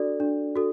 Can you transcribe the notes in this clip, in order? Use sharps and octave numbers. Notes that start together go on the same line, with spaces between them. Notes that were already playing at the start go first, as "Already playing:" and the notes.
Already playing: D4 F#4 A4 D5
D4
F#4 A4